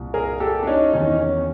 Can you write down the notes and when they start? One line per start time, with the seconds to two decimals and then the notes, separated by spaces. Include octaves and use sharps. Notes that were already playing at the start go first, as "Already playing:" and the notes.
Already playing: C2 A#2
0.14 G#4 A#4
0.40 G4 A4
0.63 D4
0.67 C#4 D#4
0.93 E2 C3 D#3 C#4 D#4
1.20 C#4